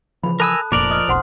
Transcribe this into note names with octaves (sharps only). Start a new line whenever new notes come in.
C#3 E3 F3 B5
A4 A#4 G#5 A5 B5 D#6 E6 F#6
F1 A#2 F3 A#4 D5 D6
D#5 D#6 F6
F1 B1 C5 F#5 C6